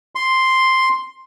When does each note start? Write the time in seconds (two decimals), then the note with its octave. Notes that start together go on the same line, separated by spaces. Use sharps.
0.15 C6